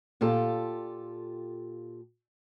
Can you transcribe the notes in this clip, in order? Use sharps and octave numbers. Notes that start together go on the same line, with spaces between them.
A#2 F4 G4 A4